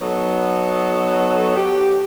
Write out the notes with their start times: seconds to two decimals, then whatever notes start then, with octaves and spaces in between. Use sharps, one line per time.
0.01 F#3 B3 D#4 A4 C#5
1.55 G4